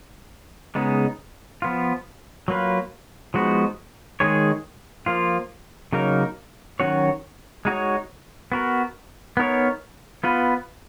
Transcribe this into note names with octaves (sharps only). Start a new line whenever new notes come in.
C#3 G#3 B3 D#4
F3 B3 F4
F#3 A#3 F4 B4
F3 G#3 B3 D#4 F#4
D#3 G#3 D#4 G#4 C#5
F3 A#3 F4
C#3 F#3 A#3 D#4 A#4
D#3 F#3 C#4 F#4 C#5
G#3 D#4 F#4 C#5
B3 F#4 A#4
B3 D#4 A#4 C#5
B3 F4 B4